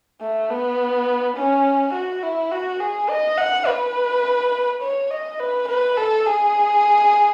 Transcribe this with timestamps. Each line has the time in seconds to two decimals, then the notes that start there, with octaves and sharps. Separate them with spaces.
0.21 A3
0.50 B3
1.36 C#4
1.94 F#4
2.23 E4
2.51 F#4
2.80 G#4
3.09 D#5
3.38 F#5
3.67 B4
4.83 C#5
5.11 D#5
5.40 B4
5.68 B4
5.97 A4
6.26 G#4